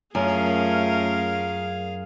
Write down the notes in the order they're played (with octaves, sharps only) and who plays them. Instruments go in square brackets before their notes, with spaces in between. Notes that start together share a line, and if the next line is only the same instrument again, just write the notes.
[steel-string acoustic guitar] F#2 [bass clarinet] A3 [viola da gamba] C#4 F4 A#4 [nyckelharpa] G#4 F5